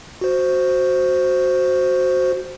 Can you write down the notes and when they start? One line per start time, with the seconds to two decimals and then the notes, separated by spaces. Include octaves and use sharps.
0.21 F#4 C5